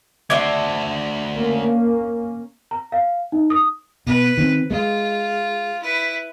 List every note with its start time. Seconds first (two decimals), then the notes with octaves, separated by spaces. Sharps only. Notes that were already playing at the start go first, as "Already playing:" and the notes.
0.30 A3 D4 F#4 C5 E5 D6 G#6
1.34 A#3 C#4
2.71 A#5
2.92 F5
3.32 D#4
3.50 D#6
4.06 B2 B4
4.37 D#3 C4
4.70 G#3 F4
5.83 E4 B4